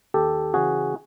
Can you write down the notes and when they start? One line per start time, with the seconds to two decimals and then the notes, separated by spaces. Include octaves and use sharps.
0.14 D#2 G4 A4
0.54 C#3 E3 F#4 G#4